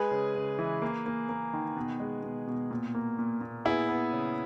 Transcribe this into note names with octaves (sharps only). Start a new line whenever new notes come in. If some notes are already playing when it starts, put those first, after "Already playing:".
Already playing: G#3 G#4 B4
C#3
C#3
E3
A#3
A#3
A#3
D#3
B2
G#3
B2
B2
A#2
A#3
A#2
A#2
B3 E4 G#4
B3
C#3